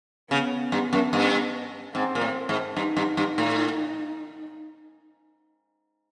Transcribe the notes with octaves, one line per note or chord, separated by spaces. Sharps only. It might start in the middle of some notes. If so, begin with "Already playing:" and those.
C#3 B3
G2
F#2
G2
G#2 C4
A#2
A2
G#2
G2 D#4
G2
G2
A2